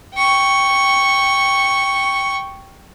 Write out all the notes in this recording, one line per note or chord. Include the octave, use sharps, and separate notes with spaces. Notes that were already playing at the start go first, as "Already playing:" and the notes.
G5 C#6